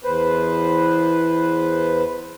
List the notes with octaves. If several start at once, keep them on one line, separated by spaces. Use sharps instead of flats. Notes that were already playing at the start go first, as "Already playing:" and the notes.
E2 B4 C5